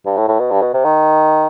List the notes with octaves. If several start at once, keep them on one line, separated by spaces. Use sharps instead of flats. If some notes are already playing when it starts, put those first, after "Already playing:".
G2
A2
A2
B2
G2
B2
C3
D#3